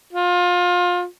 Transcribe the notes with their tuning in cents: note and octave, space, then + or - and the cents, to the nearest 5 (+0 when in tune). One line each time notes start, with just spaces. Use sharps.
F4 +25